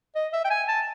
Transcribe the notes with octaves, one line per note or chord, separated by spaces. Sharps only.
D#5
E5
G5
G#5
A5